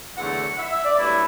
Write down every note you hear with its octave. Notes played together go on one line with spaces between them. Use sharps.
E2 D3 F#3 A3 F#5
E5
E5
D5
G2 F#3 A3 E4